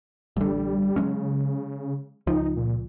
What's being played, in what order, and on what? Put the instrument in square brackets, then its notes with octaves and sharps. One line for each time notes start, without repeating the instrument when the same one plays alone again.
[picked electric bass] A1 D3 [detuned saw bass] G3
[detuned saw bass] C#3 [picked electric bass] F#3 G#3 C#4
[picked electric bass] C#2 F3 [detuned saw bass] D#4
[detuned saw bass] A#2